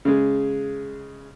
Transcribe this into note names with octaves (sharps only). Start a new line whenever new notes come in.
C#3 G#3